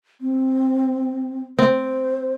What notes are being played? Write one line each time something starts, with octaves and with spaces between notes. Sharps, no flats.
C4
C4 C5